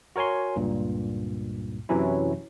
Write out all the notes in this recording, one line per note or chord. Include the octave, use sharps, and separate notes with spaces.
F#4 A#4 C#5 G#5 C6
C#2 G2 A#2
F#2 C3 E3 F#3 C#4 E4